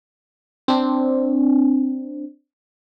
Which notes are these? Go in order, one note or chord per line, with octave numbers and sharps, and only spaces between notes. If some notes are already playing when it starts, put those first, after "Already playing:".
C4 D4